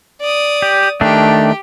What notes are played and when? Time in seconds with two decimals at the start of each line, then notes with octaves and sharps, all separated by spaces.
0.21 D5 D#6
0.62 G4
1.01 D#3 A3 D4 G4